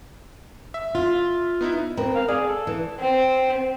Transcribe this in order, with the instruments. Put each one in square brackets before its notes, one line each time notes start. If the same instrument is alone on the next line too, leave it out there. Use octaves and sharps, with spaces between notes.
[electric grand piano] E5
[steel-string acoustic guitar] F4
[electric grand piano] B3 D#4 E4
[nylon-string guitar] C4 A#4 B4
[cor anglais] F5
[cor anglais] G#4 [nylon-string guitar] D5
[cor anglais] A4
[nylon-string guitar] E3
[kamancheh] C4